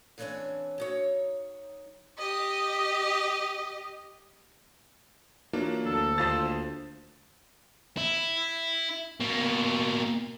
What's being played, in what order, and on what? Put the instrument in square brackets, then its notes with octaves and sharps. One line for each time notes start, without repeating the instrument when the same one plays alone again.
[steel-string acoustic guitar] C#3 E3 C4 D4 C#5 G#5
F#3 D#4 C#5
[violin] G4 D#5
[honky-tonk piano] E3 D4 F4 [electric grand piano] F#3 A#3
[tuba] D2 [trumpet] A4
[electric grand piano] D#2 F4 D#6 [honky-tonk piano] C5 A5 A6
[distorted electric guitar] E4
B2 A#3